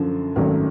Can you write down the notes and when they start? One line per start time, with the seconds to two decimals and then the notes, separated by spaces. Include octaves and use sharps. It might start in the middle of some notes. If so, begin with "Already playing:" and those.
Already playing: F#2 D3 F3
0.36 G#1 F#2 D#3 F#3 A3